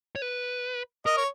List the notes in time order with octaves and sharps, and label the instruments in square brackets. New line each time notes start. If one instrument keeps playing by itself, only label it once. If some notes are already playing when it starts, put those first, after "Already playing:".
[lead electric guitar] C#5
B4
[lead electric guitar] A#4 [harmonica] D#5
[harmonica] C#5